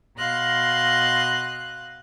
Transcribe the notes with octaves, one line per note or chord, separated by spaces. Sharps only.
B2 D#5 F5 C6 F#6